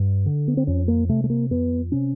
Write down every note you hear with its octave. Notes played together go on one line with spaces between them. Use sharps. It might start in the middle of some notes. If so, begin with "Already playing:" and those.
Already playing: G2
D3
B3
C4
F2 C#4
A#3
C3 A3
A3
A#3
F2 B3
C3 C#4